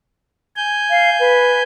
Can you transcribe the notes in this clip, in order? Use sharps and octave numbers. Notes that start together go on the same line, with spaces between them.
G#5 G6
F5
B4